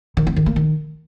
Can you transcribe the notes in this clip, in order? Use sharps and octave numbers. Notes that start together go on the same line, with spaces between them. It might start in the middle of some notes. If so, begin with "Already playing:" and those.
D#3
C4
D#3
A#3
D#3